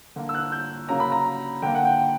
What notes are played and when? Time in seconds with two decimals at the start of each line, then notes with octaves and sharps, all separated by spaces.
0.16 D3 A#3
0.29 E6
0.35 F#6
0.52 G6
0.89 C#3 F#3 A#3 A#5
1.00 B5
1.12 A#5
1.62 D3 A#3 G5
1.75 F#5
1.85 G5